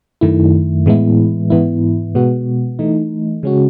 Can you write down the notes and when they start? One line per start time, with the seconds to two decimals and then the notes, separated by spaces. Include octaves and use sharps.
0.21 F#2 D#3 A3 E4
0.86 A2 E3 G#3 B3 E4
1.50 G#2 E3 B3 E4
2.15 B2 G#3 B3 F#4
2.79 E3 A3 D#4
3.43 C#3 G#3 C#4 F#4